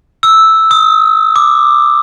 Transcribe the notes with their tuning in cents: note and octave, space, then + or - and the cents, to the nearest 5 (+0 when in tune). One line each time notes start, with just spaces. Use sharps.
E6 -5
D#6 +25
D6 +15